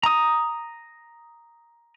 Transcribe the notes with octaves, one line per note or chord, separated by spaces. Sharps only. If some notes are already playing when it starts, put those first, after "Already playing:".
A#5 D#6